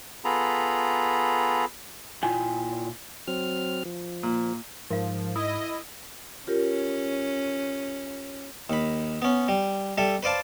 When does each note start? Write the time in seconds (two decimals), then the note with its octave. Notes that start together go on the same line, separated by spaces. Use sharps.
0.25 B3 F4 G#4 A4 A#5 B5
2.23 A#2 E4 F4 G5 G#5
3.28 F#3 C4 F6
3.85 F3
4.23 A#2
4.90 G#2 F3 A#4 F5
5.36 E4 D#5 D#6
6.47 C#4 F4 G4 A#4
8.70 D#2 B5
9.22 B3 C#4
9.48 G3
9.98 G3 A4 E5
10.23 B4 C5 D5 F5 A5